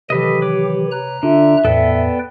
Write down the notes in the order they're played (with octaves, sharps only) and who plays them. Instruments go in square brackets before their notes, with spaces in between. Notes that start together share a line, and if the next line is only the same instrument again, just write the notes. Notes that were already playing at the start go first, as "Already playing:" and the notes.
[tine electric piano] C3 [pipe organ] D#3 E3 F#3 [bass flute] G4 [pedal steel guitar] A4 B4 D#5
[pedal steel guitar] B4 C#5 D6
[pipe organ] A#5 F#6
[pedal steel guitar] D3 [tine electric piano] D4 F4 [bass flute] E5
[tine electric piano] E2 A2 [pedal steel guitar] B3 A4 [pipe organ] B4 D5 G5